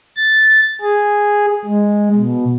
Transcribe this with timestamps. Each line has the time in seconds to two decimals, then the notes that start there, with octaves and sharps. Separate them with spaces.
0.17 A6
0.81 G#4
1.65 G#3
2.16 B2